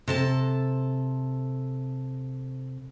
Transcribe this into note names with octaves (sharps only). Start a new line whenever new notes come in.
C3 A4 A5